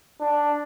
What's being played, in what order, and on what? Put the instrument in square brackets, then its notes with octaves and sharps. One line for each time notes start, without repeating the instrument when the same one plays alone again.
[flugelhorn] D4